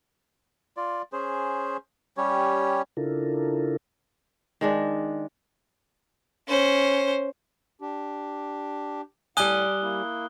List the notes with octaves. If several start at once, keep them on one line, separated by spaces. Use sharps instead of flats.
F4 D5
C#4 G#4 C5
G3 C#4 G4 C#5
C#3 D4 E4 F4 A4 A#4
D#3 G#3 D4
C#4 C5
D4 G4
A2 G3 F#5 G#5 D#6 F#6 G7
A#3 E4